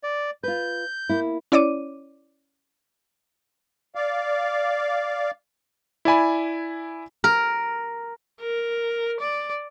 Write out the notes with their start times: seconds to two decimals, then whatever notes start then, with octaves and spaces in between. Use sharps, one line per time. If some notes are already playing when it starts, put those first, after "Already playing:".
0.03 D5
0.43 F4 B4 G6
1.09 A#3 E4
1.52 C#4 E4 C#5 D5 D6 D#7
3.95 D5 F5
6.05 E4 D5 G#5 B5
7.24 A#4
8.41 A#4
9.20 D5